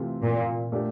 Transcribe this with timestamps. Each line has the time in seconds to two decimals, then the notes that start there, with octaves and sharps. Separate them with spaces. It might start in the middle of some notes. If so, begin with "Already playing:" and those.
Already playing: C3 E3 A3 C4 F4
0.23 A#2
0.72 A#2 A3 D4 G4 D5